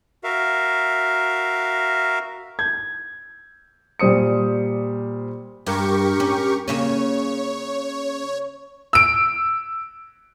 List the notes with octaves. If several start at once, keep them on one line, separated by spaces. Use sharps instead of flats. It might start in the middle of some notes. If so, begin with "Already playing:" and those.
F#4 A#4 E5 F5
G6 G#6
A#2 G3 C5 D#6 C#7
G2 G4 A#4 C#6
C#4
C#3 A#3 C#4 C#5
E6 D7